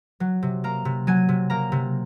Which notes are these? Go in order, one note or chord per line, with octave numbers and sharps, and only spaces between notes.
F#3
C3
A#3 A#5
C3
F#3 G#5
C3
A#3 A#5
C3